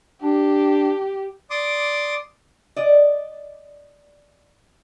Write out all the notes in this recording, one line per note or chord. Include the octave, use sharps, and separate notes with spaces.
D4 G4
D5 C6 D6 D#6
D5 D#5